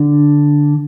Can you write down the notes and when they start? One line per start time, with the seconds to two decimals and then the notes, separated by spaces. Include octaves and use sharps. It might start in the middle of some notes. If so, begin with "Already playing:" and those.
Already playing: D3 D4